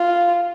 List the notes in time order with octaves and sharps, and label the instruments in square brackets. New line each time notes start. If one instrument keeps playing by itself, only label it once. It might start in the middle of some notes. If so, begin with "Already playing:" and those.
Already playing: [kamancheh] F4